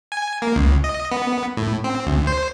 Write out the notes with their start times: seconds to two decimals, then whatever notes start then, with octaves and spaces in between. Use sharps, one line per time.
0.12 G#5
0.42 A#3
0.56 C#2
0.84 D#5
1.12 B3
1.57 A2
1.84 C4
2.06 D2
2.27 C5